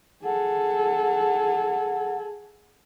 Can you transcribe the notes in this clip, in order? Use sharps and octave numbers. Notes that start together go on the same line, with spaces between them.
G#4 A4 F#5